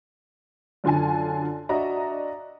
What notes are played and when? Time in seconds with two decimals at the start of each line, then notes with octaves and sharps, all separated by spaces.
0.84 F#2 D3 F4 A4 G#5 A5
1.69 D4 F#4 D#5 E5 A#5